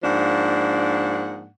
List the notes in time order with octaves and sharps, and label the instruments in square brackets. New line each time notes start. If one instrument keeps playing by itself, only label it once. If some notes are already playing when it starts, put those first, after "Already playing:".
[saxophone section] G#2 F3 A#3 D4 F#5